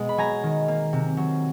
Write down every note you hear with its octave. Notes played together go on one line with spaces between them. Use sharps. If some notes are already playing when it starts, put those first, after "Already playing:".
Already playing: B2 G#3 B3
B5
F#3 G#5 A#5
D#3
A#3
C3
F#3